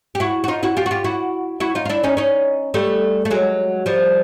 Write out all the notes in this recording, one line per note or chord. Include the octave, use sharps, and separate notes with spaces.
G4
E4 F#4
F#4
D#4 F4
E4 F#4
F4 G4
F#4
F4 G4
E4 F#4
E4 F#4
D#4 F4
F4
D4 E4
C#4 D#4
C#4 D#4
G3 A3
A3
F#3 G#3
F3 G3